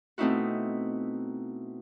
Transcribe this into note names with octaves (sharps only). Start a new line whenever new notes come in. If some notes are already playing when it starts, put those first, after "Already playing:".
B2 A3 C4 D#4 E4 F#4